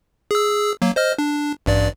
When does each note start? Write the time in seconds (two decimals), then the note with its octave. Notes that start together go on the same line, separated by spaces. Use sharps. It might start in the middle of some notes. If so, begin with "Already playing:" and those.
0.31 G#4 E6
0.82 F#3 A#3
0.96 C5 D#5 F6
1.18 D4
1.66 A1 G2 D5